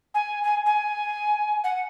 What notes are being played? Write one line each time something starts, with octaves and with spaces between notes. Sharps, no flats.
G#5
G#5
G#5
F#5